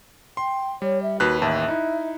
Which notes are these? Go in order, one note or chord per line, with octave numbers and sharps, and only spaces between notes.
G5 C6
G3 C#5
E5
D#2 F#4 B4 F#6
A1 D#2 E5 A5
D#4 E4